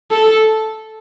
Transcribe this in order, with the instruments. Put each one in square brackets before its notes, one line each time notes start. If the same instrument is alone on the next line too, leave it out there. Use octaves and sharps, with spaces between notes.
[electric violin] A4